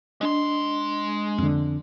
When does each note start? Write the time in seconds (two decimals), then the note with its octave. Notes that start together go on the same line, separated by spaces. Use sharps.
0.21 G#3 D4 D#5 C6
1.38 F2 D3